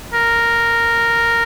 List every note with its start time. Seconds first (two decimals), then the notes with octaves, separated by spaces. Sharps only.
0.13 A#4